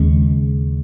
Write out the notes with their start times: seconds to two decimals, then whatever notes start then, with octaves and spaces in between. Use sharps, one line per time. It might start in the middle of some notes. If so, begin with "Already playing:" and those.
Already playing: D#2 C#3 G#3